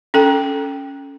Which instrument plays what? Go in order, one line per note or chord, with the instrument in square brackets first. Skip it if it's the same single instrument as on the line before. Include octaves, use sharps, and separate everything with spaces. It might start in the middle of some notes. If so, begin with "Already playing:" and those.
[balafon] C#4 A4 G5